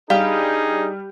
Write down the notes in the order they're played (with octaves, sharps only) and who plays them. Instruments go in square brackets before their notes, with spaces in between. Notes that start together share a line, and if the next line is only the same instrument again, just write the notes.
[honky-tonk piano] G3 [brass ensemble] D4 D#4 G#4 [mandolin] G4 B4 [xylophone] F5